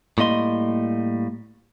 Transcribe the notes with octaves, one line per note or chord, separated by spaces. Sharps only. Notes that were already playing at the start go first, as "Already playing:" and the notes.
A2 G3 A#3 D#5 C6